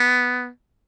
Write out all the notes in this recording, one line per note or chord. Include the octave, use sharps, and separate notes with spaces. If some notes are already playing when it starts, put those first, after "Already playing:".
Already playing: B3